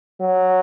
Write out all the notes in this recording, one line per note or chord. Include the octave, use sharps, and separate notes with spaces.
F#3